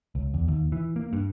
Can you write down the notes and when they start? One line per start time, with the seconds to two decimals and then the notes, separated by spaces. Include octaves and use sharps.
0.15 C#2
0.34 E2
0.48 D#2
0.72 E3
0.96 A#3
1.13 G2